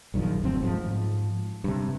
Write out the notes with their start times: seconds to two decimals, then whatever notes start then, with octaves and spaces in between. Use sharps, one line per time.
0.14 A#1 F#2 D#3 F3
0.43 E1 D2 C4
0.63 G#2 F3
1.64 G2 C3